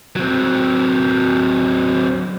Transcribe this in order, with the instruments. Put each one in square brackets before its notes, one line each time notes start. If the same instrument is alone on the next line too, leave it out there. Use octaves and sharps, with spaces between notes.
[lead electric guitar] F#3 C4